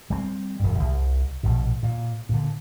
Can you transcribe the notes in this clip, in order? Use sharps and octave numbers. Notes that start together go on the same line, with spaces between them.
G3 A#3 C4
E1 G2
C2
A#1 B2
A#2
A#2 D3